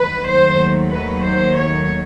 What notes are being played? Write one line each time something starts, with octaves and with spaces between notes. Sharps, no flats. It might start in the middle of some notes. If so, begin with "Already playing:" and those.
Already playing: D#2 D#3 F#3 A3 B4
C5
B4
C5
C#5